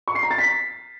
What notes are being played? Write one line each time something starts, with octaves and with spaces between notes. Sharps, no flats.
C#6
C7
A#5
A6
B6